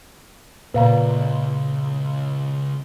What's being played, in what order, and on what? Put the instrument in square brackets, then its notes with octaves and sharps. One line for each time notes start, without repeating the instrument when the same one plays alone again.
[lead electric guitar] C#2 [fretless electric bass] A#2 [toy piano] B4 F5 A#5